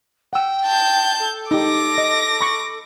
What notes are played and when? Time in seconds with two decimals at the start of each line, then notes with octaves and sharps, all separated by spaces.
0.33 F#5 G5 E6
0.65 A5 G6
1.19 A4
1.51 D#4 G4 D6 A#6
1.98 D#5
2.41 B5 C#6